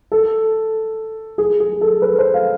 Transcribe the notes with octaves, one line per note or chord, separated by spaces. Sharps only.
A4
G#4
G#4
A4
B4
C5
F5